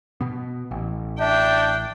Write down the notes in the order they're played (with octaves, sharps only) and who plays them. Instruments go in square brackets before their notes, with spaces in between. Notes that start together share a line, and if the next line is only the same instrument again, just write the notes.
[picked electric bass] B2 B3
A1
[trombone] D4 [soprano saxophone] E5 [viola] G5